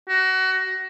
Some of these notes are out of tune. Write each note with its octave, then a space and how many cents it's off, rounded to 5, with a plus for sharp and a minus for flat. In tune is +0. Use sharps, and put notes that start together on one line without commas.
F#4 +25